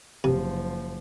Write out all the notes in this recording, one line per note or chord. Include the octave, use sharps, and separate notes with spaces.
F#1 C3 F3